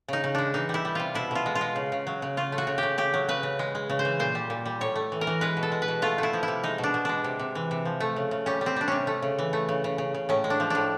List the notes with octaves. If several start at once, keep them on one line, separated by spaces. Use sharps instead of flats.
C#3 D#4
C#3
G#3 D4
E3 D#4
G3
E4
G3
C3 F4
B2 E4
B2 F4
G#3
F4
G#3
C#3
C#3
F#3
C#3
C#3 F4
A3
F#4
C#3
C#3 G4
C#3 G4
F#3
C#3 B4
C#3
G#3
G#3
C#3
C5
E3
A#2 C5
G3
A#2
G3
A2 C#5
A3
E3
A#4
E3
G#3 B4
B2
A4
G#3
B4
B2
A3 F4
A3 E4
F3
E4
C3
G#3 D#4
B2
D4
B2
G#3 D4
C3
C3
E3
C3
F3
A3
C#3
C#3
G3 C#4
G3
C4
G3 D4
C3 C#4
A3
C#3
E3
A3
C#3
C#3
C#3
C#3
A2 C#4
G#3
D4
F3
A2 D4